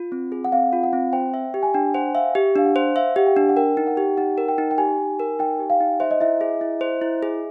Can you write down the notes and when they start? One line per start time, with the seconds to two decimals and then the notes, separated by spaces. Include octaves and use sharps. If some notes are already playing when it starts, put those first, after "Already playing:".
Already playing: F4
0.12 C4
0.32 G#4
0.45 F#5
0.52 C4 F5
0.73 F4
0.83 F#5
0.93 C4
1.13 C5 G5
1.34 E5
1.54 G4
1.63 G#5
1.74 D4 G5
1.94 C5 F#5
2.15 E5 F5
2.35 G4
2.56 D4 F5
2.65 F#5
2.76 C5
2.96 E5 F5
3.16 G4 F#5
3.27 G5
3.37 D4
3.49 F#5
3.57 A#4 G5
3.77 D#4
3.87 F#5
3.97 G4
4.17 D#4 F#5
4.38 A#4
4.48 G5
4.58 D#4
4.71 G5
4.78 G4 G#5
4.99 D#4
5.19 A#4
5.39 D#4 G5
5.59 G4
5.70 F5
5.80 D#4
6.00 C5 E5
6.11 D#5
6.20 E4 E5
6.41 G#4
6.61 E4
6.81 C5
7.02 E4
7.23 G#4